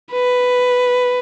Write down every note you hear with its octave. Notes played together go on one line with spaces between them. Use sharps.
B4